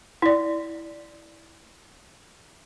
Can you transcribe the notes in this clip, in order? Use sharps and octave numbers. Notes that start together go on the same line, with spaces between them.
E4 D5